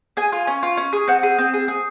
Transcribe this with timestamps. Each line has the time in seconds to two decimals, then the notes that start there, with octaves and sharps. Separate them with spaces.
0.17 G#4 G#5
0.32 F4
0.47 C#4
0.63 F4
0.77 C#4
0.93 G#4
1.08 C4 F#5
1.23 G#4
1.38 C4
1.54 G#4
1.68 G#4